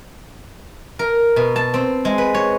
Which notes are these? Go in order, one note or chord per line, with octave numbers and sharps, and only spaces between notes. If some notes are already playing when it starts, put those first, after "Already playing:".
A#4
B2
A5
C4
G#3
B4
C#5